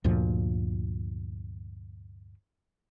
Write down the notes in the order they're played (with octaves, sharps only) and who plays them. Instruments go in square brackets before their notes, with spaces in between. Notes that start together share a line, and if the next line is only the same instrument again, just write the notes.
[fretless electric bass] D2 G2 A#2 F3